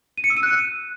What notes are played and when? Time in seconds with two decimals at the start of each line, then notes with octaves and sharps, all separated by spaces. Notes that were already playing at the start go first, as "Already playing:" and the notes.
0.18 D#7
0.24 C#7
0.30 E6
0.37 D#7
0.43 F#6